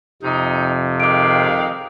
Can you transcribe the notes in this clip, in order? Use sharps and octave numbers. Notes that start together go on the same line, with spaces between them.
F2 C3 D#4
D#3 G#3 F5 D6 D7